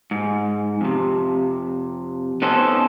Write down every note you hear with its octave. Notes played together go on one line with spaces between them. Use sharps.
G#2
F2 C3
B3 C#4 D#4 A4 C5